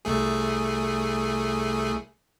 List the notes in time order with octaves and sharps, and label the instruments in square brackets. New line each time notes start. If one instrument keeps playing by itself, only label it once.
[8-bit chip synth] C2 A3 G#4